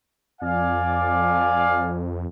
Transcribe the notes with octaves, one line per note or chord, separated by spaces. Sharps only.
F2 D5 F5 G#5